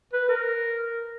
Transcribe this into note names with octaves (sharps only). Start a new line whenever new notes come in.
B4
A#4